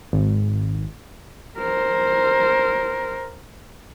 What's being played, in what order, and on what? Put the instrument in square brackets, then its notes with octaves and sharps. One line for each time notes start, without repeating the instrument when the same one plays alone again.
[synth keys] G#1
[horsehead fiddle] A#4 C5